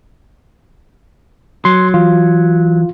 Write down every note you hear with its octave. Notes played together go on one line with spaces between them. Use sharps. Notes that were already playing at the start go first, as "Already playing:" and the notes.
F#3 C6
E3 F4